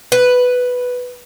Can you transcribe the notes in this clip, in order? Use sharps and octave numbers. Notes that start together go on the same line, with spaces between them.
B4